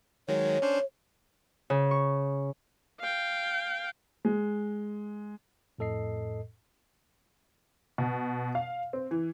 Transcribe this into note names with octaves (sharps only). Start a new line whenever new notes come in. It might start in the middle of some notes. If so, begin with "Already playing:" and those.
D#3 F#3 G#3 C#5
C#4 D4 C5
C#3
C#6
F5 G5
G#3
F2 A2 A4 D#5 C7
B2
F5
C4
E3